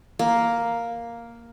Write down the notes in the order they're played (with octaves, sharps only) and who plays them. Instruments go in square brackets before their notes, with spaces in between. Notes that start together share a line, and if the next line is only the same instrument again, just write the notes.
[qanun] A#3